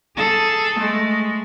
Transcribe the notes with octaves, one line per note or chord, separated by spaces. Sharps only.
G#4 A4
G#3 A3